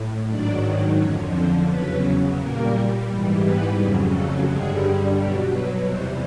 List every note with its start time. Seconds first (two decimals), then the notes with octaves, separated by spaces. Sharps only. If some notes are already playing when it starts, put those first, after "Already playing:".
Already playing: A2
0.28 G#2 D#3 F#3 D4 D5
0.98 F2 D3 F3 C#4 C#5
1.32 C4 C5
1.68 E2 C#3 F#3 B3 B4
2.37 A#2 G3 A#3 A#4
3.06 G#2 E3 G3
3.42 B3 B4
3.77 F2 C#3 F#3
4.11 A3 A4
4.46 G2 D3 G3 G#3 G#4
5.16 B2 F#3 G3 G4
5.50 B3 B4
5.86 E2 C3 E3 G3 C4 C5